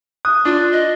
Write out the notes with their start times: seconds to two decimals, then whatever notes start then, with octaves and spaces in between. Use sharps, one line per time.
0.25 D#6 F#6
0.45 D4 F4
0.72 D#5